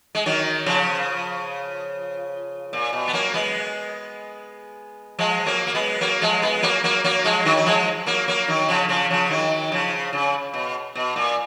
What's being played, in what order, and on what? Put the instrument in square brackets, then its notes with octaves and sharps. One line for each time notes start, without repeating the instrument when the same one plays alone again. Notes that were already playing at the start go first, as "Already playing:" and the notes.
[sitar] G#3
D#3 F#3
C#3 F3
A#2
B2
B3
F#3 A#3
G#3 B3
F3 G#3
F#3 A#3
A#3
G#3 B3
F#3 A#3
F3 G#3
G#3 B3
F#3 A#3
F#3 A#3
F#3 A#3
F3 G#3
D#3 F#3
F#3
F3 G#3
F#3 A#3
F#3 A#3
D#3 F#3
C#3 F3
C#3 F3
C#3 F3
D#3 F#3
C#3 F3
C#3
B2
B2
A#2